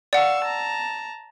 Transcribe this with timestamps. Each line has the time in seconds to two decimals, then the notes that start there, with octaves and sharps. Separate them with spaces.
0.13 D5 F5 F#5 C#6 E6
0.44 A5 A#5